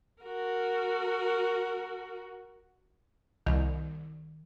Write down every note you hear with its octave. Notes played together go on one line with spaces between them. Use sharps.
F#4 A#4
C2 D#3